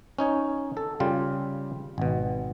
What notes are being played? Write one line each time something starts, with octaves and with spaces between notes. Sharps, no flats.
C#4 D#4 C#5
A4
C#3 G3 F4 G4
G#1 B2